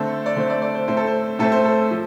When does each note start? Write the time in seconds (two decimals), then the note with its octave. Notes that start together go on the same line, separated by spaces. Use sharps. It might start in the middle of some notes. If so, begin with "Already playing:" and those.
Already playing: D3 A3 C4 A4
0.26 D5
0.36 D3 A3 C4 C5
0.50 D5
0.62 D5
0.75 C5
0.88 A2 A3 C4 C5
0.97 A4
1.07 C5
1.39 A2 A3 C4 A4
1.52 C5
1.65 A4
1.91 F3